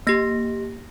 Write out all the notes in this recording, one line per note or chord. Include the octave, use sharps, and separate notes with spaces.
A#3 G4 A#6